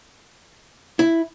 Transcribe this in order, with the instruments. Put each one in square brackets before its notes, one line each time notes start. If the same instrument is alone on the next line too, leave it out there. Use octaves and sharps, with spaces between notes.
[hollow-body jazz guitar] E4